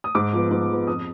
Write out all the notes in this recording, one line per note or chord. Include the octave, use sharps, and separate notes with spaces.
D#6
G#2 D6
F3 B3
G#2
F3 B3
F2 D#6